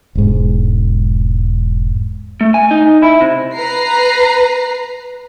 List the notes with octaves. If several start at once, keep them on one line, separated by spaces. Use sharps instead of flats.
E1 G#2
A3
G#5
D#4
E4
C3
B4 A#5 C7